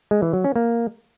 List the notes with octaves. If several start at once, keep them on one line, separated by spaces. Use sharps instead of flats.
G#3
E3
F#3
C#4
A#3